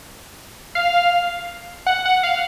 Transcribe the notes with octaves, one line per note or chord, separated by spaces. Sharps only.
F5
F#5
F#5
F5